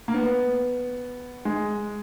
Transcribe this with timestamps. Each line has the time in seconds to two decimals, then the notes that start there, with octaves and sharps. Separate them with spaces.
0.08 A#3
0.14 B3
1.45 G#3